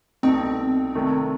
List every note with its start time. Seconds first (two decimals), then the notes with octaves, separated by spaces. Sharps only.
0.23 C2 B2 A3 C4 D#4
0.95 C2 C3 D#3 A3